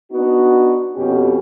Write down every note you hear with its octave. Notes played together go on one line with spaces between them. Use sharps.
B3 D4 D#4 F#4
F2 B2 C#4 G4